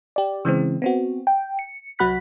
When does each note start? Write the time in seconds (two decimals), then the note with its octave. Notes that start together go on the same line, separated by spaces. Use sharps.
0.16 G4 D5
0.45 C#3 E3 G#3 C4
0.82 B3 C4 F#4
1.27 G5
1.59 C#7
1.99 C2 F#3 F#4 B5 F#6 B6